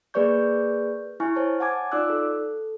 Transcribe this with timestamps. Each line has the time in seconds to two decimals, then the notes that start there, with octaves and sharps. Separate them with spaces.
0.14 A#3 G#4 B4 D5 C#6 G6
1.20 E4 G#5 C#6 F6
1.35 C5 C#5 A5
1.60 F#5 G#5 A5 D6 G#6
1.92 D#4 F4 D5 D6 E6 F#6
2.10 A4